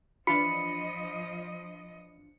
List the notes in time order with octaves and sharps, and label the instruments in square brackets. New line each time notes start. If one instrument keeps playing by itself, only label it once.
[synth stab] E3 D4 F4 [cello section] F3 D#5 [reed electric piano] B5 [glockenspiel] C#7